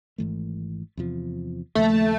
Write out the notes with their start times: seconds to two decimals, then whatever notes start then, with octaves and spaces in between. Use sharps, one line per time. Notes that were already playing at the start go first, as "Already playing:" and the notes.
0.18 G#1 G#2 E3 A3
0.97 E2 C3 F3
1.75 D#2 C#3 F3 A3 A#3